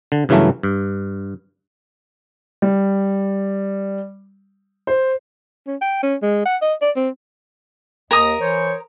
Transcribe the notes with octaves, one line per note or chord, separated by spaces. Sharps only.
D3
G2 C#3 E3 F#3 A3
G2
G3
C5
C#4
G5
C#4
G#3
F#5
D#5
D5
C4
D#2 A#4 D#5 A#5 D#6
E3 C5 C#5